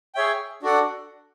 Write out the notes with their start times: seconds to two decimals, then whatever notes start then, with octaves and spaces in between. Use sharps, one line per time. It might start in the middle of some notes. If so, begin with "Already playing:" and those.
0.15 G#4 C#5 E5 G5
0.62 D4 F#4 A4 D5 F#5